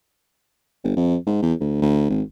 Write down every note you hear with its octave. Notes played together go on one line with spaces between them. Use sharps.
G1
F2
G#2
E2
D2
D2
G#1